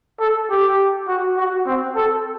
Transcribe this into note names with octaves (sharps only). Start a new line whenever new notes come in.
A4
G4
F#4
F#4
C4
A4